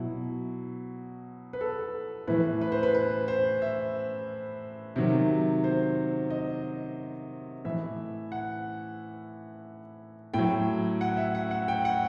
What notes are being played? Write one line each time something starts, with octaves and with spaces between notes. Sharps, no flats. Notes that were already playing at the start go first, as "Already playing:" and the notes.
Already playing: B2 F#3 E4
B4
A4
A2 E3 B4
B4
C5
B4
B4
C5
E5
C3 D#3 F#3
C5
D#5
A2 E3 E5
F#5
A2 F#3 G5
F#5
E5
F#5
F#5
G5
F#5